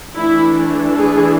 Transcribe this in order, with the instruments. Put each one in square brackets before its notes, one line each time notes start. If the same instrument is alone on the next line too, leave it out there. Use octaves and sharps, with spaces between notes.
[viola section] E3 A3 D4 E4
G#4